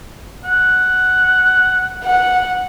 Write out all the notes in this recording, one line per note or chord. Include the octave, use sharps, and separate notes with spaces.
F#5
F#5